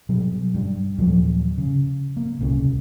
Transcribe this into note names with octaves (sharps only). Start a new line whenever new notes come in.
B2 F#3 G3
G2 G3
D#2 A#2 F3 F#3
C#3
A#3
D#1 C2 C#3